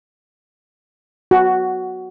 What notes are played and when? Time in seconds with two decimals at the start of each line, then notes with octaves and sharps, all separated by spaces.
1.31 F#4